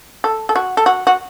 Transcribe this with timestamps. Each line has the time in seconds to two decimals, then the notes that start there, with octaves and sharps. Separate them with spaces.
0.24 A4
0.49 A4
0.56 F#4
0.77 A4
0.86 F#4
1.07 F#4